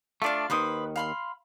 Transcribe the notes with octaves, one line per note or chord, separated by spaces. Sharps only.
A3 D4 F4 D5 F5
D#2 D#3 B4 C5 D#6
F5 B5 C6